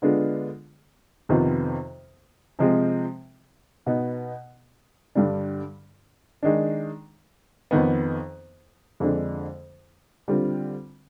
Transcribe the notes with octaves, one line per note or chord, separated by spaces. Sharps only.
D3 G#3 B3 D4 F4
F2 C3 D#3 B3 F4
C3 F3 G#3 C4
B2 B3 D#4
G2 D3 G3 D4
D#3 G#3 D4
F2 D#3 B3
F2 D3 G#3 D4
D3 G3 C4 F4